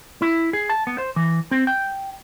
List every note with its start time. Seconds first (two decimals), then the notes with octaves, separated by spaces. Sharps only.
0.22 E4
0.53 G#4
0.70 A5
0.87 B3
0.98 C5
1.16 E3
1.51 C4
1.67 G5